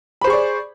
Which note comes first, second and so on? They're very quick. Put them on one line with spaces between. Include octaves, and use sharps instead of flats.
B5 C5 G#4 C#6 D5